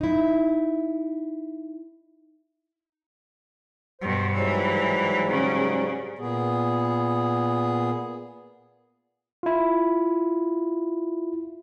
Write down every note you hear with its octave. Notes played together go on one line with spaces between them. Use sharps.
D#4 E4
G2 B2 C5
G#2 E3 F#3 G3
C#3
A#2 B3 G#4
E4 F4